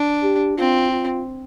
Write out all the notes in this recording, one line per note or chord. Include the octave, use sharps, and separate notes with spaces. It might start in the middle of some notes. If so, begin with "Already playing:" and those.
Already playing: D4
G4
C4 F4
F4